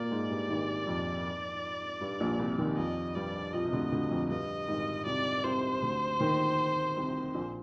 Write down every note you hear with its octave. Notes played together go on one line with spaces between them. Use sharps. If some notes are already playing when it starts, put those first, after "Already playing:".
Already playing: A#2 A#3 D5
G#2 G#3
G2 G3
G#1 G#2
F2
G2
A#1 A#2
C2 C3
D#2 D#3
F2 F3 D#5
G2 G3 D5
F2 F3 D#5
C3
D2 D3
D2 D3
F2
G2 D#5
G#1 G#2
C2 C3 D5
C2 C3 C5
D2 D3
D#2 D#3
C2 C3
A#1 A#2